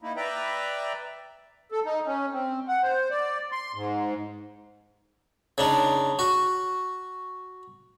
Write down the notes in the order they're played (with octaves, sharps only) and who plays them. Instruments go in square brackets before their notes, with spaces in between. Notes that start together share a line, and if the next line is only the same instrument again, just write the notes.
[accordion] A#3 D#4 E4
B4 D5 E5 G5 A#5
A4
D#4
C#4
C4
F#5
C5
D5
C6
G#2
[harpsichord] C#3 D4 D#4
F#4